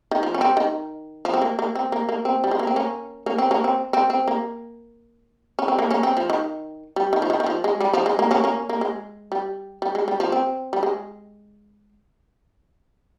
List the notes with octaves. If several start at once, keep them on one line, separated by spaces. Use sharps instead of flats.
D#3
F3
C#4
C4
D#3
F3
C4
A#3
A#3
C4
A#3
A#3
C4
G3
G#3
A#3
C4
A#3 C#4
A#3 C#4
C4
A#3 C#4
C4
C4
C4
A#3
C#4
C4
A#3
A#3 C#4
C4
F3
D#3
G3
D#3
F3
D#3
D#3
F3
G#3
G3
F3
G#3
A#3
A#3 C#4
A#3 C#4
A#3
G#3
G3
G3
G#3
G3
F3
C4
G3
G#3